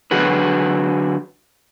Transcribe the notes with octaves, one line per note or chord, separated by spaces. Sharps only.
D3 F#3 F#4 G#4 B4